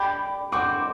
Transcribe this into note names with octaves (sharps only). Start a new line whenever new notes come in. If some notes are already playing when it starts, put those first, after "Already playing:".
Already playing: G4 D5 G5 B5
C4 F#4 C5 G5 D6